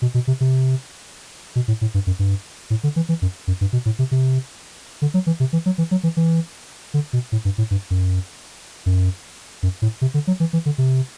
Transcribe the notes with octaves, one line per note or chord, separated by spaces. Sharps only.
B2
B2
C3
C3
B2
A2
A2
G2
F#2
G2
A2
D3
E3
E3
F#2
F#2
G2
B2
A2
C3
C3
D3
F#3
E3
C3
E3
F#3
E3
F#3
E3
E3
D3
B2
A2
G2
A2
G2
F#2
F#2
F#2
A2
C3
D3
F#3
E3
E3
D3
C3